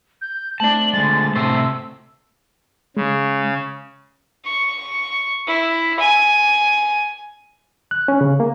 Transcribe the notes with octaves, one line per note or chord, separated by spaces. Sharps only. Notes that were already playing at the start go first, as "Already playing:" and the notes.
G6
A3 C4 E4 D5 A5 F#7
D3 G#3 A6
A2 C3 D4 A4 C5 E6
C#3 G#3
C#6
E4
G#5
F#6
C#4
C#3
A#3